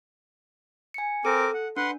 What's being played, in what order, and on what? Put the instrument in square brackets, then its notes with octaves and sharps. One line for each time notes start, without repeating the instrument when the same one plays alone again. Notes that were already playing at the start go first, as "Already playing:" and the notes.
[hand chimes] G#5 C#7
[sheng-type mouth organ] C4 A#4 D6 [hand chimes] A4
[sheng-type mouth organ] F#5
[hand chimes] D4 [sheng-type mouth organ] B4 F#5 C6